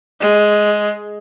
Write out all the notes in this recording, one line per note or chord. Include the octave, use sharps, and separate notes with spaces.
G#3